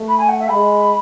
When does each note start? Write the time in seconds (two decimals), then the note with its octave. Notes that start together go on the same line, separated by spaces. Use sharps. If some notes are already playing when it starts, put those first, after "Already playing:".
Already playing: A3
0.08 B5
0.18 G#5
0.29 F#5
0.40 E5
0.50 G#3 B5